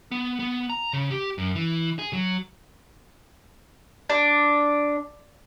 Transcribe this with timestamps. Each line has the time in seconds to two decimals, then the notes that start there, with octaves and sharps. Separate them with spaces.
0.11 B3
0.39 B3
0.69 A#5
0.93 C#3
1.11 G4
1.38 F#2
1.55 E3
1.99 G#4
2.13 F#3
4.10 D4